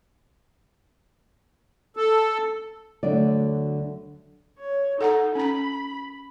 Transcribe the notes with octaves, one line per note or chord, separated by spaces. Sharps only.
A4
D2 D3 F#3 D5
C#5
D#4 A4 F#5 A#5
C#4 A#5 B5